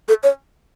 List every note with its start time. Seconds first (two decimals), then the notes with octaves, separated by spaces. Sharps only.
0.08 A4
0.23 C#5